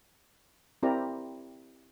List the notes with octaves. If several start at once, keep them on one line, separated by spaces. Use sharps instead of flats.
C4 E4 G4 A#4 D5 A#5